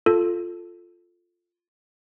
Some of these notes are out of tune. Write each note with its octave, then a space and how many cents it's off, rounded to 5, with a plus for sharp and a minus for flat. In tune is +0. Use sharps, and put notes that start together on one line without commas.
F4 +0 A4 +0